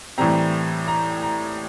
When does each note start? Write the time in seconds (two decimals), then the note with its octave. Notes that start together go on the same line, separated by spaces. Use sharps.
0.18 A2 E3 G3 C4 A#5
0.88 A#5
1.23 A#5